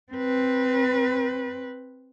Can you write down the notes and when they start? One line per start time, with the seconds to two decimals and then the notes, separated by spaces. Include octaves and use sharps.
0.13 C4 B4